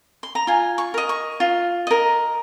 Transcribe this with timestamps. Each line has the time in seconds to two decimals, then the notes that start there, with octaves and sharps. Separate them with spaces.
0.23 C6
0.35 A#5
0.47 F4 G#5
0.78 C#6
0.94 A#4 D#5
1.09 C#6
1.40 F4
1.87 A#4 D#5